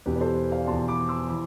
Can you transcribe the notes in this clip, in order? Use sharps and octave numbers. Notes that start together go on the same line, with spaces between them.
E2 B2 G4 B4
B4
A4 C5
D5 F5
E2 B2 A5 C6
B5 D6
C6 E6
E3 B5 D6